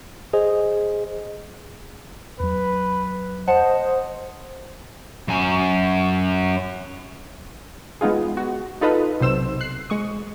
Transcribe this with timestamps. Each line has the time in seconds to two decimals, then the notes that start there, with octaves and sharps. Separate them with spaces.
0.33 G#4 C5 D#5
2.40 E2 F#3 B4
3.48 C5 D#5 F#5 A5
5.28 F#2 G#5
8.01 G#3 B3 D#4 F4 G#4
8.37 F#4
8.81 D#4 F4 A4 B4 D#5
9.21 B1 C3 C5 E6 E7
9.61 F#6 C7
9.90 G#3 C#6 D#6